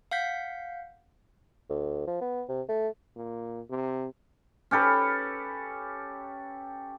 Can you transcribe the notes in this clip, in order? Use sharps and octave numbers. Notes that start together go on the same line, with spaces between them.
F5 F#5 G6 B6
D2
F3
B3
C3
A3
A#2
C3
C#4 G4 A4 B4